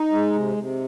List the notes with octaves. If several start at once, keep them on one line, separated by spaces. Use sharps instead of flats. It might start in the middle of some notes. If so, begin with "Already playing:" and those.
Already playing: D#4
G#3
C3
C3